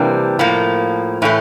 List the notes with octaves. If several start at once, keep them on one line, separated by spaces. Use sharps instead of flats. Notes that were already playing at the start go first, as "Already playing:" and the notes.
Already playing: C3 E3 G3 A#3 D4
A2 F3 A#3
A2 E3 A3